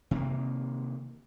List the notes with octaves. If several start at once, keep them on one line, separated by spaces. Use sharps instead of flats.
C3 D#3 A#3